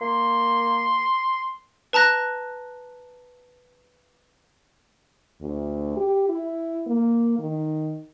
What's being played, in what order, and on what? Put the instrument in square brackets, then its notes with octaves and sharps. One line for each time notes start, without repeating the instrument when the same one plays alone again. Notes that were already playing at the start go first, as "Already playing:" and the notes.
[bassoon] A#3 [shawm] C6
[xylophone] B4 A5 A#5 F#6 A#6
[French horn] D2
G4
E4
A#3
D#3